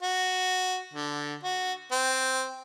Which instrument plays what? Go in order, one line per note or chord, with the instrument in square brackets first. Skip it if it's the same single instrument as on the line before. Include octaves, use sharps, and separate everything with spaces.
[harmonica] F#4
D3
F#4
C4